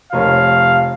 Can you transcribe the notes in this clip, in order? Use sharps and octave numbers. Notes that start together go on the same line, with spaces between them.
F1 A#4 C#5 F5